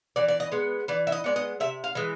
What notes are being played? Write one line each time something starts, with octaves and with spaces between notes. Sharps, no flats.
E3 D5
D5
D#5
G#3 B3
E3 D5
E5
D#5
G#3 B3 D5
D#5
C3 E5
F5
E3 G#3